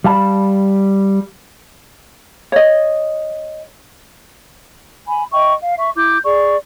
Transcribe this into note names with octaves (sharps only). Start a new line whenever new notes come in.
G3 F5 A5 B5
C#5 D#5
G#5 B5
D#5 E5 G5 C#6
F5
E5 C#6
E4 D6 G6
G#4 D5 C#6